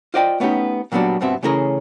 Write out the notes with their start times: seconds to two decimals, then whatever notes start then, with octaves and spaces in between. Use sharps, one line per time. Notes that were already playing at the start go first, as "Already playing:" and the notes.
0.14 F4 C5 D5 D#5 F#5 G5
0.40 A3 B3 C#4 D#4 G4
0.92 A#2 F#3 G3 B3 D4 F#4
1.21 G2 B2 B3 C4 E5
1.43 C#3 E3 A3 C#4 G#4 A#4